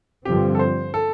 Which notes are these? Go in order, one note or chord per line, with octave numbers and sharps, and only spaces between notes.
G2 D3 F3 C4 G4
A4
C5
A4